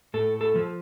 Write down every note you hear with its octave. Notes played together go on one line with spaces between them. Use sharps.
A2 A4
A4
F3